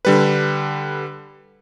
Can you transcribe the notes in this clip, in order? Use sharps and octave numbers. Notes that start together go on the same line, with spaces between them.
D3 G3 B4